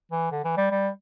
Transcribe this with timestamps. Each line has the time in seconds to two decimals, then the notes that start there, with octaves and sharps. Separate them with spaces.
0.11 E3
0.32 D3
0.44 E3
0.57 G3
0.71 G3